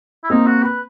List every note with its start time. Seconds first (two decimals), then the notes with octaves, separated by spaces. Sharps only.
0.24 E4
0.30 A#3 C4 D#4
0.47 F#4
0.63 B4